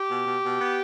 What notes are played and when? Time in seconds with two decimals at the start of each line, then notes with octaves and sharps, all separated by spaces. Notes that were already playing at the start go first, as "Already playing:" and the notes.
Already playing: G4
0.09 B2
0.26 B2
0.43 B2
0.60 B3